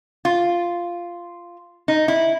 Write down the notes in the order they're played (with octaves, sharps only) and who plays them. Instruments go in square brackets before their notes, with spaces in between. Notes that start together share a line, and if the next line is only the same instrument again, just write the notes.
[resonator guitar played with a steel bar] F4
D#4
E4